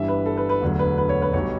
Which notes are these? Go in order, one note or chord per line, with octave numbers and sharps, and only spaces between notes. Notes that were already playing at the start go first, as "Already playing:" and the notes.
Already playing: G1 G2 E3 G3 E5
B4
A4
B4
B4
E1 D2 D3 F#3
B4
B4
C#5
B4
B1 B2 G3 C#5